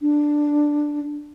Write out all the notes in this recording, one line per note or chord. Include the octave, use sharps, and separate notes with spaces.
D4